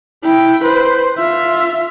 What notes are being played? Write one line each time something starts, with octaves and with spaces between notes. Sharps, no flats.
E4 G5
B4 C5
F4 E5